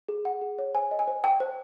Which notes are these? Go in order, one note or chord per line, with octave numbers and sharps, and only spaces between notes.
G#4
F#5
G#4
C#5
C5 G#5
D#5
G#5
C5
G5 A5
C5